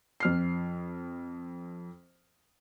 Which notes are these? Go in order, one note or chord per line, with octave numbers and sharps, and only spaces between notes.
F2 F6 C7